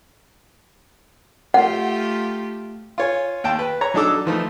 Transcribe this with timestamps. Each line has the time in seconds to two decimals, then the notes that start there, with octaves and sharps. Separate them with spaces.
1.54 A3 F4 G4 F#5
2.98 F4 C#5 G#5
3.44 D#2 G5 A5
3.59 B4
3.81 C#5 A#5
3.94 F#3 D4 D#4 A4 D6 E6
4.26 E3 F3 A3 D#4